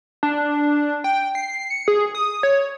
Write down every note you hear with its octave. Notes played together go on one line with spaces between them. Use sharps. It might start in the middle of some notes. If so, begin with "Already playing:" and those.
D4
G5
C7
C#7
G#4
D#6
C#5